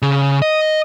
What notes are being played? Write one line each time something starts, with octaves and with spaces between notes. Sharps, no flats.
C#3
D#5